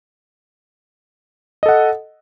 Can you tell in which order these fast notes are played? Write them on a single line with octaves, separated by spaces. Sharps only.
D#5 A4 F#5